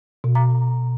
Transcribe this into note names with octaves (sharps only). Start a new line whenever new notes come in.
B2
A#5